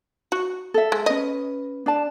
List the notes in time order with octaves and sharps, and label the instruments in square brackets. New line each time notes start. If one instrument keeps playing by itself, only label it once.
[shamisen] F#4
[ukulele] A4 E5
[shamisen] G#3
[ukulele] C#4 B4 [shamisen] D#5
[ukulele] D4 D5 A5